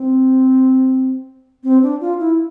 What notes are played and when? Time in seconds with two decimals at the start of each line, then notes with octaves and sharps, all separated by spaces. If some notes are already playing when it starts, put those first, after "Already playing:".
Already playing: C4
1.64 C4
1.82 D4
2.01 F4
2.19 E4